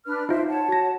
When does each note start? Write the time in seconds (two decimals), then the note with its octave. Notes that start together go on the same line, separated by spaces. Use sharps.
0.06 D4 B4 F6
0.29 D#4 F4 C5 E5
0.48 C#5 F#5 A5
0.69 F#4 A#6